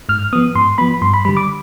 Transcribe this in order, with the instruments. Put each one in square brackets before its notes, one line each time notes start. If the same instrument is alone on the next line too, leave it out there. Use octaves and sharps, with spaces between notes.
[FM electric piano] G#2 F6
F3 B3 D#6
G#2 C6
F3 B3 B5
G2 C6
B5
D3 G3 B5
D6